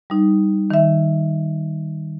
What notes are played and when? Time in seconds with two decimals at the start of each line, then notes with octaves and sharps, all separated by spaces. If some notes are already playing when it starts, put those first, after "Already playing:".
0.10 G3 D#4
0.71 D#3 E5